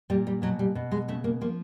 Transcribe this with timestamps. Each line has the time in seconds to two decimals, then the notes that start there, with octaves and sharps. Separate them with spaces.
0.10 A#2 G3
0.27 G3
0.42 B2 F#3
0.59 G3
0.75 B2
0.92 G#3
1.08 C#3 A3
1.24 A#3
1.41 F3 A#3